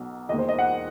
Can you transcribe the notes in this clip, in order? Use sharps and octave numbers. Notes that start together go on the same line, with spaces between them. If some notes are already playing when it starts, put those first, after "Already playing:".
Already playing: B1 B2 F#3
E1 D#2 D#3 D#5
C5
D#5
F#5